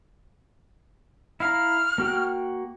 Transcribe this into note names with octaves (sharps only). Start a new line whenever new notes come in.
E4 F5 A#5 F6
A#3 F#4 G5